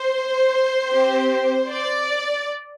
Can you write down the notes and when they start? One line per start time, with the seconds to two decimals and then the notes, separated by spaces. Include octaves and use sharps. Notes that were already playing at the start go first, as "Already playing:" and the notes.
Already playing: C5
0.90 C4 G4
1.69 D5